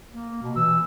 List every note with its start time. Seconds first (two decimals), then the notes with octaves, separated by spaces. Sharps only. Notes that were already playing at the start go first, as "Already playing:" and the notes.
0.12 A#3
0.42 B2
0.56 E3 E6